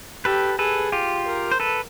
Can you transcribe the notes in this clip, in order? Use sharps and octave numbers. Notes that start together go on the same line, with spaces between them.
G4 A4 B4
G#4 A4 B4
F4 G4
A#4
C5
A4 B4